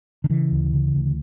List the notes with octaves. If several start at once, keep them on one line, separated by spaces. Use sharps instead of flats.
D3
C#3 E3
D2
C#3
D2